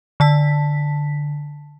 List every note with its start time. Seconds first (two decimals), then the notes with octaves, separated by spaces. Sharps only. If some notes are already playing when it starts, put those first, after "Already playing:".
0.20 D3 A5 B6